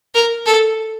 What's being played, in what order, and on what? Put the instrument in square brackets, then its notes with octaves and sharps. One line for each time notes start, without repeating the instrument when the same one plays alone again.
[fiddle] A#4
A4